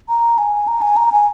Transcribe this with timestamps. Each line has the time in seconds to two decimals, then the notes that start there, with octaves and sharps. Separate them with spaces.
0.09 A#5
0.38 G#5
0.68 A#5
0.82 G#5
0.96 A#5
1.12 G#5